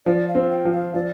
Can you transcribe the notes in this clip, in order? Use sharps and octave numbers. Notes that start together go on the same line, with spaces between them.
F3 D5
F5
C4
G5
F3
F5
F3 D5